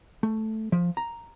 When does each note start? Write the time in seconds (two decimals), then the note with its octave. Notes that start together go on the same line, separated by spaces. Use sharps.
0.23 A3
0.72 F3
0.97 A#5